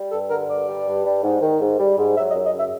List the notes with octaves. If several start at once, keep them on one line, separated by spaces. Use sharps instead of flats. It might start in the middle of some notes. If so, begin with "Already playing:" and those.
Already playing: G3
G2 A4
D3 A#4
G2 D5
G3
G2
G3
G#2
D#3
G#2
G3
G#2
F#3 E5
D#5
F#2
D#5
C#3
E5